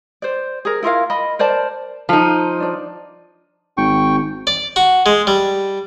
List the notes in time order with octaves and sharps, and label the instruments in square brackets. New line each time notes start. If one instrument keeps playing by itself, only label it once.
[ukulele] C5 D5
G#4 A#4
E4 F4 A#4 F5
D#5 B5
A#4 C5 D5 A5
[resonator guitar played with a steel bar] F3 D#4 [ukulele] A4
[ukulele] D4 D5
[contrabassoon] G#1 [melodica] G5 C#6
[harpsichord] D5
F#4
G#3
G3